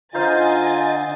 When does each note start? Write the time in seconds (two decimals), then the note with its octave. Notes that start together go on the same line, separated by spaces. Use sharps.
0.14 D3 D#4 F4 C5 D#5 F5 G#5 A6